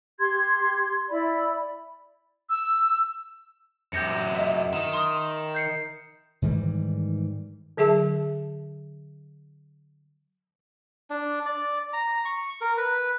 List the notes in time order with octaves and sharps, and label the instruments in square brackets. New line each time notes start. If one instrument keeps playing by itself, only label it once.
[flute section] G4 C6 G#6
E4 D5 B5
[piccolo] E6
[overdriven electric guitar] F#2 G4 [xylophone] G6 A#6 C#7
[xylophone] D#5 E5
[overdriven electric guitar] D#3
[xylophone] C6 D#6
G6 C7 C#7
[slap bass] G#2 D#3 E3 G3
[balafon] D3 F#3 G#4 E5 A5
[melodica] D4
D5
A#5
C#6
A#4
B4